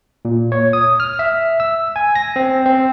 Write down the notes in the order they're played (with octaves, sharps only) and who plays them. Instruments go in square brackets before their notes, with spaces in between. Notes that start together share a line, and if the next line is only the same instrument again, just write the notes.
[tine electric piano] A#2
C#5
D#6
F6
E5
E6
G#5
A#6
C4
C4